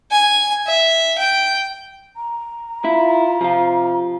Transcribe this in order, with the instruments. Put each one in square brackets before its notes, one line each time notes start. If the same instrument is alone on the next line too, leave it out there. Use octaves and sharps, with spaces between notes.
[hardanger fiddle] G#5
E5
G5
[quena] A#5
[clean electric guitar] E4 [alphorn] F4
[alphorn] C3 [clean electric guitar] F3 F4